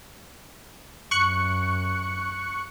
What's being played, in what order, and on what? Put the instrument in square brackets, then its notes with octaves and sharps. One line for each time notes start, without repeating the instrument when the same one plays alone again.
[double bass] F#2 [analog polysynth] C#6 F#6 C#7